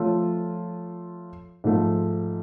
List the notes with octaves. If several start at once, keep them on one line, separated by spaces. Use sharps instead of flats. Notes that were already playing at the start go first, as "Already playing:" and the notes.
Already playing: F3 A3 F4 A4 C#5
G#2 F3 A3